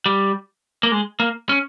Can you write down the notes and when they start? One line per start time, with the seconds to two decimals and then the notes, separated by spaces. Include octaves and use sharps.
0.06 G3
0.83 A#3
0.92 G#3
1.20 A#3
1.49 C#4